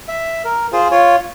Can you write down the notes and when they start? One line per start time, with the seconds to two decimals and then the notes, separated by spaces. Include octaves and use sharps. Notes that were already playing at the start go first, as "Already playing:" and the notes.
0.08 E5
0.44 A#4
0.73 F4 G#4 C5
0.91 F4 C#5